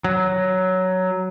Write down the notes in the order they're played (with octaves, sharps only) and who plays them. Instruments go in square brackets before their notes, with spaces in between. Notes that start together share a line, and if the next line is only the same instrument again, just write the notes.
[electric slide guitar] F#3